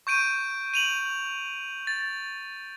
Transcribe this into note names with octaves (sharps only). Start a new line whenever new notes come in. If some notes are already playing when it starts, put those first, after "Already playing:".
C#6 G6 D7 D#7
D#7 F7 F#7
A6